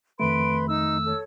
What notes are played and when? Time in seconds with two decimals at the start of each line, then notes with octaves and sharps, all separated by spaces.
0.20 F2 D#3 A3 B4 B5 C6 D7
0.68 D#4 E6
1.07 A4 C#5